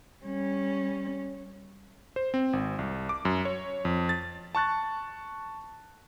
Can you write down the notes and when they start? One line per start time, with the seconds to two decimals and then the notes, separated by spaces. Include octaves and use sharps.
0.23 G3 C#4
2.16 C5
2.34 C4
2.53 G#1
2.79 C2
3.09 D6
3.25 F#2
3.45 C#5
3.85 F2
4.09 A6
4.55 A5 C#6 F#6 A6